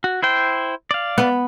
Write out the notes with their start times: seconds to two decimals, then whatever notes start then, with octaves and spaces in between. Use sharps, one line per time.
0.04 F#4
0.22 E4 C5 G5
0.91 D5 F5
1.18 B3